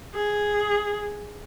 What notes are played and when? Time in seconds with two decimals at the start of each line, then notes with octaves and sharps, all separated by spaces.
0.15 G#4